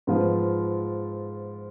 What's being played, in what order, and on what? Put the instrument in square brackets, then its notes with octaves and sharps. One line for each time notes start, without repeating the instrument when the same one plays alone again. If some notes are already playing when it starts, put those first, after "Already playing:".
[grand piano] G#2 F3 B3 F4